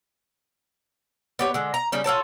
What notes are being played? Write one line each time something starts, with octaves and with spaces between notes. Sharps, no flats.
B3 G4 C#5
D3 G#3
A#5
C#3 G3 C#4
F4 A4 C#5 A5